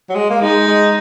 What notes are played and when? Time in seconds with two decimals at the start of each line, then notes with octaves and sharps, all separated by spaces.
0.09 F#3
0.15 G#3
0.30 A#3
0.41 G#3 D#4
0.67 G#3